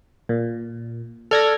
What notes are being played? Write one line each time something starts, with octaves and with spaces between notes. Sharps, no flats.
A#2
A4 D5 F6 G#6 A#6